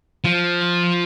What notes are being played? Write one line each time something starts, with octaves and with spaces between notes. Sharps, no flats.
F3